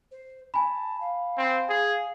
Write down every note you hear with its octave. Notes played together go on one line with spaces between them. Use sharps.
C5
G#5 A5 B5
F5
C4
G#4